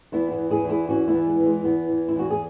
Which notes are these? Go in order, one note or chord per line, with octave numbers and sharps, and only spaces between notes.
E2 B3 E4
B3 E4
E3
E4 G#4
E2
E4 G#4
E3 C#4 F#4
B3 E4
E2
G#3
E3
G#3
E2 B3
E3
E4
E2 F#4
G#4